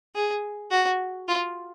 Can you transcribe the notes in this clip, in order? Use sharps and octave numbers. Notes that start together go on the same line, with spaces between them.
G#4
F#4
F4